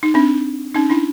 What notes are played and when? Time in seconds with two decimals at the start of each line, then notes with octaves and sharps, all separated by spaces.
0.03 D#4
0.14 C4 D4
0.74 C#4 D#4
0.90 D4 E4